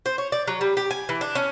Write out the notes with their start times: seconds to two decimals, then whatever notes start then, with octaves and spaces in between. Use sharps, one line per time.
0.06 C5
0.18 C#5
0.32 D5
0.47 F#3
0.61 G3
0.77 G4
0.91 G#5
1.09 E3
1.21 D4
1.35 C#4